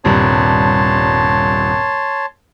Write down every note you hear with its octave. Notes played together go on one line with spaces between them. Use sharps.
D#1 G2 C3 C#5 A5 C6